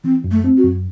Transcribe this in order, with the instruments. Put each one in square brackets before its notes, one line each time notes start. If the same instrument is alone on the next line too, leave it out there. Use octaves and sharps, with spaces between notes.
[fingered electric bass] E3 [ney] C4
[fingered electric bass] F#2
[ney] A3
[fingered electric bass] C4
[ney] F#4
[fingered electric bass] F#2